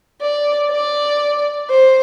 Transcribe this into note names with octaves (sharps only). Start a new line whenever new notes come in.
D5
D5
C5